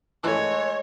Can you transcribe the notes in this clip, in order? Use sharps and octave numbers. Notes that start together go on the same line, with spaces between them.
E3 G#3 A3 C#5